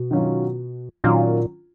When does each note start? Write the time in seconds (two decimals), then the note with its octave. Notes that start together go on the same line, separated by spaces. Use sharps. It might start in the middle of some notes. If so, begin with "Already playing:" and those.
Already playing: B2
0.11 D#3 F#3 C#4 F4
1.04 A#2 D#3 F#3 C#4 F4